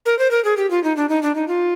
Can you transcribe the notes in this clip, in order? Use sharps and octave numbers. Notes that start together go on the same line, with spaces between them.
A#4
C5
A#4
G#4
G4
F4
D#4
D4
D#4
D4
D#4
F4